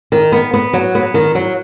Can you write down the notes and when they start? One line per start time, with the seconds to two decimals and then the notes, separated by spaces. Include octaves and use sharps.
0.12 D#3
0.32 B3
0.54 B3
0.73 F#3
0.95 B3
1.14 D#3
1.35 F#3